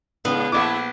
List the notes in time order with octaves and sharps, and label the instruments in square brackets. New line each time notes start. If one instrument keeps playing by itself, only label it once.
[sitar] G#2 C#3 [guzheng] B3
[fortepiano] A#1 D6 [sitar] A3 E4